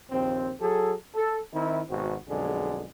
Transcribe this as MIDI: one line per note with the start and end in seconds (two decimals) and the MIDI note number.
0.11 0.52 34
0.11 0.52 39
0.11 0.52 60
0.60 0.93 54
0.60 0.93 68
0.60 0.93 69
1.15 1.38 69
1.53 1.81 51
1.53 1.81 60
1.53 1.81 64
1.89 2.15 32
1.89 2.15 47
1.89 2.15 60
1.89 2.15 66
2.28 2.87 35
2.28 2.87 41
2.28 2.87 50
2.28 2.87 56
2.28 2.87 68